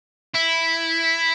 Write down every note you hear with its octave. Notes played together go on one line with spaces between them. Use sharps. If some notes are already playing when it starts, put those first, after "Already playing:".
E4